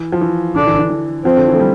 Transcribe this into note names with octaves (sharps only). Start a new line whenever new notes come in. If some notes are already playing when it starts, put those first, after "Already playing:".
Already playing: E3
F3
E3
D3 D4
E3
E3
E3
F3 C4
D3
E3
A3
G3